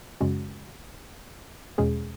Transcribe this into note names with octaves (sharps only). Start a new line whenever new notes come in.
F#2 C#3 G#3 C#4 F#4
E2 B2 G#3 C#4 G#4